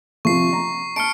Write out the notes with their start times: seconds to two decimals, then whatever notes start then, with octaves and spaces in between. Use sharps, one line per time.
0.25 C3 F3 C#6 C7
0.53 A#5
0.96 A5 F6 C#7 D7